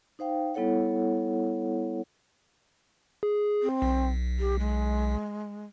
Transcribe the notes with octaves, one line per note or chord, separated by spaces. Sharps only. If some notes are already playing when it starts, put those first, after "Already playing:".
D#4 C5 F5 G5
G3 B3 E4 A4 C#5 F#5
G#4
C4
B1
G4
G#3